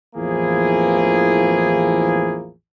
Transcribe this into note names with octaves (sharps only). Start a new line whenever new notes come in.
A1 E2 F3 A#3 E4 G#4